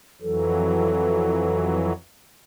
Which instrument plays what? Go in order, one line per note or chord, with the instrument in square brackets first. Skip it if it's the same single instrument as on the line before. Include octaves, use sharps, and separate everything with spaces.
[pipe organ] F2 E3 F#3 [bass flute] A4